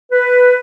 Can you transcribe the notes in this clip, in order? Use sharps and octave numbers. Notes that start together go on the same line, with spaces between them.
B4